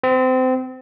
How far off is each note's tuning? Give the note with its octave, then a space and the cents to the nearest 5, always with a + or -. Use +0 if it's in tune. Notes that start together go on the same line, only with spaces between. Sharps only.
C4 -25